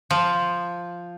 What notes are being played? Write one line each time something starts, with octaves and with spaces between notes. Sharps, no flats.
F3